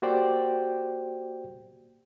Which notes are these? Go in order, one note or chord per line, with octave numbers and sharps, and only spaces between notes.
A#3 F#4 G4 C5 D5 G5